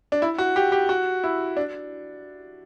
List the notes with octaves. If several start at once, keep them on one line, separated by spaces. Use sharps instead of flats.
D4
E4
F#4
G4
G4
F#4
E4
D4